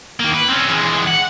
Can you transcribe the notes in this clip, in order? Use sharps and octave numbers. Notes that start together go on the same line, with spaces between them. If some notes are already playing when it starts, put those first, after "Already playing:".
D#3 A#3
B4
C4 C#4
E3 G#3
F#5